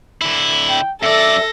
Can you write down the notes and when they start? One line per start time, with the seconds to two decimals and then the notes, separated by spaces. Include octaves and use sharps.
0.22 D3 E4
0.69 G5
1.03 F#2 A4 D5 E5 A#6